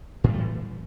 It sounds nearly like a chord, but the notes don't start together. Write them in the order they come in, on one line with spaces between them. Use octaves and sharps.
A2 G3 A3 E3